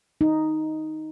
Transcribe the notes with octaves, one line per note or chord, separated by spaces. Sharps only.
D#4